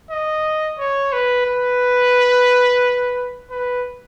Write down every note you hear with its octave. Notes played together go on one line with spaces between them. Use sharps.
D#5
C#5
B4
B4
B4